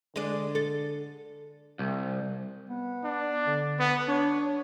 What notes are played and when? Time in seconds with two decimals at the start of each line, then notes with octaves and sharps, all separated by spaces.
0.16 D3 G#3 D4
0.55 A4
1.79 C2
2.70 B3
3.04 D4
3.47 D3
3.79 B3
4.08 D4 C#5